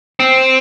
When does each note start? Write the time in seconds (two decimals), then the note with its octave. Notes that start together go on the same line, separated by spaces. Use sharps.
0.20 C4